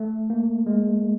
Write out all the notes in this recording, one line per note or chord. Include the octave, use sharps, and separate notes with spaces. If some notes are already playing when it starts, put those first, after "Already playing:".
Already playing: A3
A#3
G#3